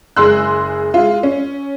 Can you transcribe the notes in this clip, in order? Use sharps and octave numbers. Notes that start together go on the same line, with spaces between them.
F#1 G#3 G#4 C6 E6 F#6
G#3 F4
C#4